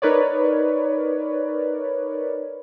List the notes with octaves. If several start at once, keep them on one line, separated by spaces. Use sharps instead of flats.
D#4 A#4 B4 C#5 D5